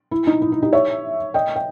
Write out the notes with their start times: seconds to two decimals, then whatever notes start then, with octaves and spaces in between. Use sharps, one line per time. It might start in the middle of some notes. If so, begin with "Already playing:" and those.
0.11 E4
0.27 D#4
0.42 E4
0.52 E4
0.62 D#4 G4
0.73 C#5 E5
1.34 D#5 G5
1.56 G5